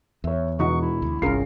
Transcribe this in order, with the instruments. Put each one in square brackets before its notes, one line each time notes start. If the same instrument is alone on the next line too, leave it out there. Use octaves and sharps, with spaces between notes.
[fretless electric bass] E2 [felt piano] C#5 E5
[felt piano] E1 [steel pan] E3 D#4 F#4 [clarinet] C#6
[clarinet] E4
[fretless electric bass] D2
[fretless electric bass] G1 C2 [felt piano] C#4 G#4 C7 [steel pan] F4 A#4